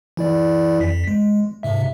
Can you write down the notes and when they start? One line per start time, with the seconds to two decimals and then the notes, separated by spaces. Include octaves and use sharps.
0.17 E3 E4 D5
0.80 F2 B6
1.07 G#3
1.63 G#2 C3 E5